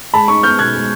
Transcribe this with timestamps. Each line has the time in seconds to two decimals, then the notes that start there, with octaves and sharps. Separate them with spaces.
0.14 G#3 A5 B5
0.28 D#4 B5 C#6
0.43 B3 F6 G6
0.59 B2 F#6 G#6
0.74 G#3